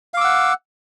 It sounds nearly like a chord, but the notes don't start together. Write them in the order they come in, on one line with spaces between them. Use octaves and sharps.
F5 D6 E6 F#5